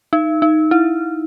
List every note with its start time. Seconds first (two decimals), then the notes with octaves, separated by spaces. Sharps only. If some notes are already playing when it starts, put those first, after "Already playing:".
0.13 D#4
0.42 D#4
0.71 E4